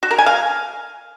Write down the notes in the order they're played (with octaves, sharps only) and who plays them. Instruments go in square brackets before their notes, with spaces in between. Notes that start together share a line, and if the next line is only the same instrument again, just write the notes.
[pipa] F#4
A#4
G#5
F5